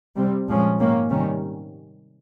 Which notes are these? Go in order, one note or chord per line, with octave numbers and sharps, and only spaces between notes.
C3 G3 C4
A#2 F3 G#3 C#4
G#2 D#3 A#3 C#4
C3 D#3 G3 C#4